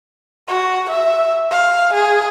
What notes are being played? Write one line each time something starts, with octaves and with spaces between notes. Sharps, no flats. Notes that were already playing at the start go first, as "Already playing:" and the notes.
F#4
E5
F5
G#4